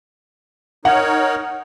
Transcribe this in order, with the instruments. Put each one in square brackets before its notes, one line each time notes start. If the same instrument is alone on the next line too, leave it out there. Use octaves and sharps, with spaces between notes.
[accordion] D#4 A#4 C#5 [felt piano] F#5